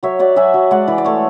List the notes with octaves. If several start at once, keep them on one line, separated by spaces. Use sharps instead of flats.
F#3 C#5 E5
F#3 D5 F#5
F#3 E5 G#5
F#3
G#3 D5 F#5
E3
D5
A3 A4 C#5